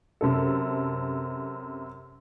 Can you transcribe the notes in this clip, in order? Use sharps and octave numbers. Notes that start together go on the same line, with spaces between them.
F#2 C3 A4